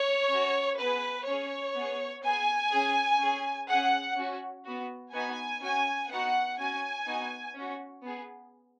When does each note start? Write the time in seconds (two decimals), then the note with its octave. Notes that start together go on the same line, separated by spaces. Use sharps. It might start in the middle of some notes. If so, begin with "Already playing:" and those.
Already playing: C#5
0.31 C#4 F#4
0.79 B3 B4
0.84 G#4
1.27 C#4 G#4 C#5
1.75 B3 G#4
2.25 B3 G#4 G#5
2.72 C#4 G#4
3.21 C#4 G#4
3.69 G#4 F#5
3.74 C#4
4.17 C#4 F#4
4.65 B3 F#4
5.14 B3 D#4 F#4 G#5
5.62 C#4 F#4 G#5
6.10 B3 D#4 F#4 F#5
6.59 C#4 F#4 G#5
7.07 B3 D#4 F#4
7.55 C#4 F#4
8.03 B3 G#4